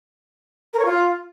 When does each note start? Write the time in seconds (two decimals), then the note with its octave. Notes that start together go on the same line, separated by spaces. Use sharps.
0.73 A#4
0.79 C#5
0.85 F4